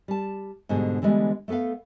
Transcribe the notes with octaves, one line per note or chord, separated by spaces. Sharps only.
G3 A5
G#2 B2 D3 G3 G#4
D3 E3 G3 G#3 B3
A3 B3 A4 B4 F5